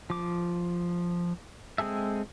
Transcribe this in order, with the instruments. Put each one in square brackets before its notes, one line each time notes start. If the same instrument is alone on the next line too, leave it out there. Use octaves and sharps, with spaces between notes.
[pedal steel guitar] F3 D6
G#3 C4 G#4 A4 E5